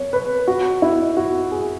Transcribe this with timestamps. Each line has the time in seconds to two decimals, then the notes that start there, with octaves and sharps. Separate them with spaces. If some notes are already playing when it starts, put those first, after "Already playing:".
Already playing: C#5
0.13 B4
0.48 F#4
0.82 E4
1.17 F#4
1.52 G#4